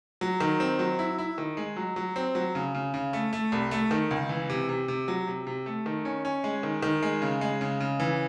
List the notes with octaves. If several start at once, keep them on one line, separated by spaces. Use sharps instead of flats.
F#3
D#3
C4
F#3
E4
E4
D#3
G#3
F#3
F#3
C4
F#3
C#3
C#3
C#3
A3
A3
C2
A3
D#3
C#2
E3
C3
C3
C3
F#3
C3
C3
A3
D#3
C#4
C#4
G#3
D#3
D#3
G#3
C#3
G#3
C#3
C#3
E3